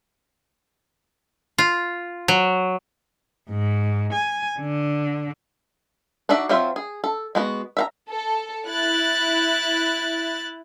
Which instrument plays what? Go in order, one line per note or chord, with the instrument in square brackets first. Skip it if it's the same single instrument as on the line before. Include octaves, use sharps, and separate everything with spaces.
[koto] F4
F#3
[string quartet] G#2
G#5
D3
[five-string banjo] D4 D#4 F#4 D5 E5
F#3 C4 F4 C5 E5
G#4
A4
G#3 B3 F#4
E5 F5 A#5
[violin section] A4
E4 F#6 A6